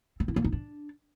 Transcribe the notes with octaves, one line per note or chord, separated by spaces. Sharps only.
C4
E4
A#3
D#4
D4